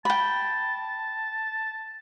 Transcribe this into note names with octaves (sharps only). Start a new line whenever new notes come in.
G5 A5 B5